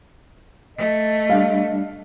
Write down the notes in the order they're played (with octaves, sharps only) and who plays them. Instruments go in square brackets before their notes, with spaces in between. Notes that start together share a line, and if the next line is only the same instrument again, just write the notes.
[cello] A3 [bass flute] D#5
[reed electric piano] G3 D4 [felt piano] F5